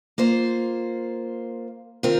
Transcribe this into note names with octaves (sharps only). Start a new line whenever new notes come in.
A#3 F4 C5
D#3 C4 F4 A#4